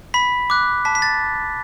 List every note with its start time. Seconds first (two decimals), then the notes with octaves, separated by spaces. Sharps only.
0.14 B5 B6
0.50 D6 F#6
0.85 A5 B6
0.95 B6
1.02 A6